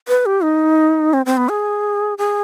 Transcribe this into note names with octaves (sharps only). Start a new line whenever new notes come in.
B4
G4
D#4
C4
C4
B3
G#4
G#4